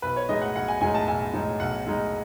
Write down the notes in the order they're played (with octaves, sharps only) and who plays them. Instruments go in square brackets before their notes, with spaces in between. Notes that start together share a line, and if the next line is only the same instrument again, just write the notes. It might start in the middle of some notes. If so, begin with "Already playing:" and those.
[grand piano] B1 B4
C#5
A2 G#3 D#4 D#5
F#5
B1 F#5
G#5
A2 G#3 D#4 G#5
A5
B1 G#5
A2 G#3 D#4
B1 F#5
A2 G#3 D#4